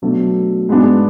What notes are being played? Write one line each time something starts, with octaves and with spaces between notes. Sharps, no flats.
B2 F#3 A3 D4
G#2 G#3 B3 D4